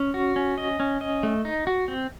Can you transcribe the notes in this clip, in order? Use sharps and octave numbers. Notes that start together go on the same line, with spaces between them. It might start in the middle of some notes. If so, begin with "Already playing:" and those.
Already playing: C#4
F#4
C#4
D#5
C#4
D#5
A3
D#4
F#4
C4